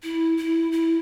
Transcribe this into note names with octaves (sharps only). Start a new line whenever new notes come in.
E4
E4
E4